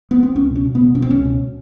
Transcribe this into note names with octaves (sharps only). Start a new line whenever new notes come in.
B3
C4
C#2 C#4
B2
C#4
B2
B3
B2
B2 C#4
C4
C#2 C#4
B2